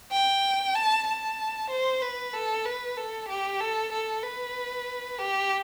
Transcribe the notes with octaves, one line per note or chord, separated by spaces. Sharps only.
G5
A5
A5
C5
B4
A4
B4
A4
G4
A4
A4
B4
G4